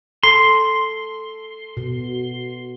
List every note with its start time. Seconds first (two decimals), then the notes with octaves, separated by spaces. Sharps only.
0.23 A4 C6 C7
1.77 B2